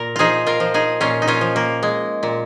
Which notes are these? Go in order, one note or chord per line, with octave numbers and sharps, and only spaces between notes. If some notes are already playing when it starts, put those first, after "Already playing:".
Already playing: A#2 A#4
F3 D#4 F4 G#4
F4 A#4
F3
D#4 G#4
A#2 C#4 F4
D#4
C#4 F4
F3
A#3
G#3
A#2